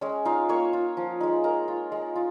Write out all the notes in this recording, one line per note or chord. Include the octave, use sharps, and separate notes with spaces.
G#3 C#4 C#5
D#4 F4 F5
A#3 C#5 C#6
F4
F3
G#3 D#4
G#3 A#4 A#5
F4
G#3
F4